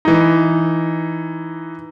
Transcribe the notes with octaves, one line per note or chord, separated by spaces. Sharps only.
E3 D#4